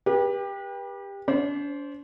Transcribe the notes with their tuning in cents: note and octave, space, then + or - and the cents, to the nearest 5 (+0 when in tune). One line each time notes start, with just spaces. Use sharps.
G4 +20 B4 -35
D4 -40 C5 +0